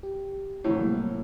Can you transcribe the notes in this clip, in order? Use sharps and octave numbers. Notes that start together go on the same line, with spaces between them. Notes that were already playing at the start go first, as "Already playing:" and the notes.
G4
C2 A2
F#3 G3 A#3